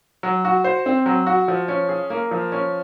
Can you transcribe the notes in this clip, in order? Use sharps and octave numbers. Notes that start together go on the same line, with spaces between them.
F#3
F#4
C5
C4
F#3
F#4
F3
C#4
G#4
A#3
F3
C#4